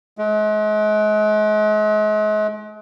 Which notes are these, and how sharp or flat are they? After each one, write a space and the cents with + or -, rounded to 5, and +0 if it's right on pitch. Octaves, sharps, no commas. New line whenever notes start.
G#3 +40